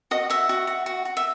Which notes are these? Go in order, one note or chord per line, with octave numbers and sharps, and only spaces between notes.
F#4 D#5
F#4 E5
F#4
F#4
F#4
F#4
E5